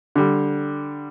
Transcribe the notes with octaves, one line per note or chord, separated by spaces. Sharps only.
D3 G3